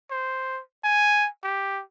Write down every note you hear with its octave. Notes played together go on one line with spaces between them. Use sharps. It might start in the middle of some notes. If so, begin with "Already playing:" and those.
C5
G#5
G4